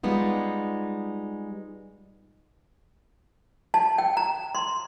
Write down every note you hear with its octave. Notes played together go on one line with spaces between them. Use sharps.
G3 G#3 B3 D#4 F4
A5
G5
A#5
C6